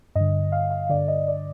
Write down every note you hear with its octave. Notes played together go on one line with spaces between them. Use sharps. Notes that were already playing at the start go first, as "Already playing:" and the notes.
G2 D3 D#5
F5
F5
G2 D3 D5
D#5
D5